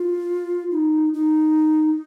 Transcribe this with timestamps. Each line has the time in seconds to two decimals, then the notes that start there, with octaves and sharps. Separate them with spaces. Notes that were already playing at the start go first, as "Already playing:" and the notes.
Already playing: F4
0.71 D#4
1.14 D#4